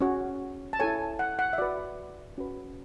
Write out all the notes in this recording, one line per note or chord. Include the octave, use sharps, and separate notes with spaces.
C#4 F#4 C#5
A5
E4 A4 C#5 G#5
F#5
F#5
E5
F#4 B4 D5
C#4 F#4 B4